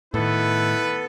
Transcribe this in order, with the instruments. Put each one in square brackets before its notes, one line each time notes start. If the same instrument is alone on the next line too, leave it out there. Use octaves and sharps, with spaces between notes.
[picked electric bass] A2 D#3 [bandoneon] B3 A4 [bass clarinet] E4 [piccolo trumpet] B4